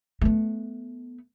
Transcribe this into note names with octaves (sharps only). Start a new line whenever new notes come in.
A3 B3